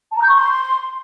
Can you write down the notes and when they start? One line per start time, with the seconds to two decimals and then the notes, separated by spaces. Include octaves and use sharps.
0.11 A5
0.17 A#5
0.22 G6
0.28 C#6
0.33 C6